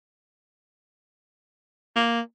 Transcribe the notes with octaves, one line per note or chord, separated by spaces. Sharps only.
A#3